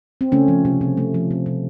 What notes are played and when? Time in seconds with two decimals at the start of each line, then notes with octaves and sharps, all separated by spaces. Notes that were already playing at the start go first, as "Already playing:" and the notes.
0.21 C4
0.32 C#3 A3 C#4
0.48 F3
0.65 C3
0.81 C3
0.97 A3
1.14 F3
1.31 C3
1.46 C3